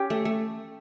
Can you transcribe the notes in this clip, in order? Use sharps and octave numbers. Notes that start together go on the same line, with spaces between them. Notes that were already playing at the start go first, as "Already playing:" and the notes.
Already playing: C#4 G4 G5
A3
A3